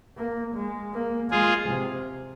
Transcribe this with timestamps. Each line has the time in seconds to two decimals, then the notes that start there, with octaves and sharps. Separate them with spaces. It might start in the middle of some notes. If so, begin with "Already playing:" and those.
0.17 A#3
0.55 G#3
0.94 A#3
1.31 G#3 F4 G#4
1.69 C3